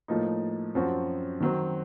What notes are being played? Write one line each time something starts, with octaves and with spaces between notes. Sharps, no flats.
A2 F3 A#3 D#4
F#2 F3 C4 F#4
D#3 F#3 C4